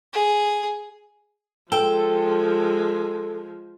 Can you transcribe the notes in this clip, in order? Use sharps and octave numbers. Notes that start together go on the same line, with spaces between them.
G#4
F3 G#3 A4 G5